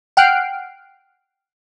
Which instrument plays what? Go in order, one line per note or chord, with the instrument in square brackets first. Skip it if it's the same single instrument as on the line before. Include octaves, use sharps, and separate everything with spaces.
[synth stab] F#5 G5 F6 F#6 C7 D7